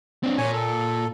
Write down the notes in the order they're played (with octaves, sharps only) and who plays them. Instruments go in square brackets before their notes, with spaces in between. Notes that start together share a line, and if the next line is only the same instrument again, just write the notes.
[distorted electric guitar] C4 D4
[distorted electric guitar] A#2 [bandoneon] C#5 G#5
[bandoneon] A4